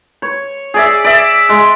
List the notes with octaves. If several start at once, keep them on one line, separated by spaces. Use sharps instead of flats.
C#5
G#4 D5 E5
D5 E5
G#3